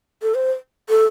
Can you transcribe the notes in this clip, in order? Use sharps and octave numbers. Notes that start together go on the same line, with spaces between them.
A4
C5
A4